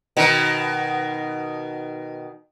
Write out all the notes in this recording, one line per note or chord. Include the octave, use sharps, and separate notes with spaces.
B2 D#3